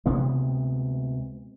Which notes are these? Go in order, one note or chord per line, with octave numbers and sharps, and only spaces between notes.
D2 C3 G#3 B3